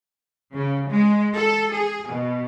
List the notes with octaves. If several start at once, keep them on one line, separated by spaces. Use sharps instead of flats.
C#3
G#3
A4
G#4
B2